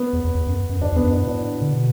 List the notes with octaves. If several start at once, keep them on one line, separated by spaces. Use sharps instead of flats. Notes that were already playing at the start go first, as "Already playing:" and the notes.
Already playing: B3
E2
E2
E2
F#2
F#2
E2 D4
E2
B3
F#2
A2 D4
A2 D4
D3
B2